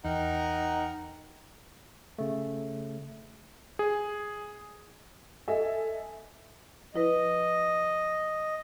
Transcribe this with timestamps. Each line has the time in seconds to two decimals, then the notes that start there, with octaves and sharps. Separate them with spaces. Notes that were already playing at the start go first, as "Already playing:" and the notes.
0.05 E2 D#4 A#4 F#5 G5 A#5
2.18 C#3 A3
3.79 G#4
5.48 A4 D#5 E5 G#5
6.95 F3 E4 B4 D#5